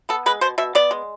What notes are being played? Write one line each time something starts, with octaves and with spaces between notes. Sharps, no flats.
B3 A4
G#3 B4
B2 C5
B2 E5
B3 D5
G#3